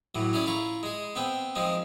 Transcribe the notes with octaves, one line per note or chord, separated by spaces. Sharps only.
A2 E3 F#3
C#4 E4 G#4 D5
E4 F4 A#5 C#6
G#3 G#4
B3 C4 G5
D#3 F3 G#3 C4